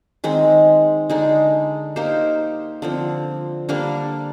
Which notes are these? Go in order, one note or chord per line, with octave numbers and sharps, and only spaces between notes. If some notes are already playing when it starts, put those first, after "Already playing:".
D#3 G#3 C4
D3 G#3 D#4
A#3 D#4 G4 C5
D3 F3 C4
D3 G3 A#3 D4